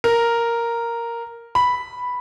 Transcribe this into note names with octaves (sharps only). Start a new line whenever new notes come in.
A#4
B5